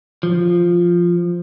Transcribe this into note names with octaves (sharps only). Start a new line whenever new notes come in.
F3